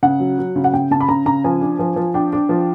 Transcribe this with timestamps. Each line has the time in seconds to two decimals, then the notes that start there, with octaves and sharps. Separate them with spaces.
0.03 C#3 F#5
0.20 F#3
0.39 F#3
0.56 C#3
0.64 F#5
0.74 C#3 G5
0.91 C#3 A5
1.01 B5
1.09 C#3 A#5
1.26 C#3 A#5
1.44 F3 G#5
1.61 D4
1.79 F3
1.96 F3
2.14 D4 G5
2.33 D4
2.49 F3